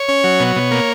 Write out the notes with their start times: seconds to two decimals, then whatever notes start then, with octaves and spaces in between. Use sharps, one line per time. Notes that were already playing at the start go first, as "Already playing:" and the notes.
Already playing: C#5
0.08 C#4
0.24 F#3
0.40 B2
0.56 B2
0.71 A#3